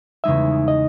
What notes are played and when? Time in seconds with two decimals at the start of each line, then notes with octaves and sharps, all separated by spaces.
0.24 E2 C#3 G#3 D#4 E5
0.68 D#5